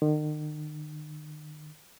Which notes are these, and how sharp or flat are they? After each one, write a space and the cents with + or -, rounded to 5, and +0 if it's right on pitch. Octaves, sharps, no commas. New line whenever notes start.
D#3 -40